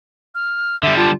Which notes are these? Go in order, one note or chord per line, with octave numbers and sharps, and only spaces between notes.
F6
D3 G3 E5
F4 A5